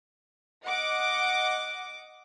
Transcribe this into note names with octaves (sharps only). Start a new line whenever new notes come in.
D#5 F#5 D6